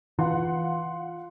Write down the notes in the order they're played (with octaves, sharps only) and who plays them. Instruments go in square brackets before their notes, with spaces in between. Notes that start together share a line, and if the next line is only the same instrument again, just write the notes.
[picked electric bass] E3 [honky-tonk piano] F4 F#5 C6